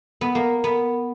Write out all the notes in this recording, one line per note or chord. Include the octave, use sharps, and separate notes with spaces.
B3
A#3
B3